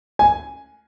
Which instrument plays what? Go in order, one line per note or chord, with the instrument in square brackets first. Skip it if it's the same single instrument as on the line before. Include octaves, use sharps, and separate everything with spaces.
[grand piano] G#5